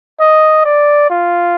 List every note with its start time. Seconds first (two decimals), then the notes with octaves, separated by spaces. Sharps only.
0.20 D#5
0.65 D5
1.10 F4